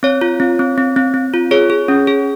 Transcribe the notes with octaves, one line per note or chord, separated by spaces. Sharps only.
C4 C#5
F4
C4
C4
C4
C4
C4
F4
G#4 C#5
G#4
C#4
G#4